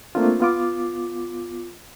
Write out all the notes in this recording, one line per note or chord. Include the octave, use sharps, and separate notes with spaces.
A3 A#3 C4 D4 F4
B3 F4 D6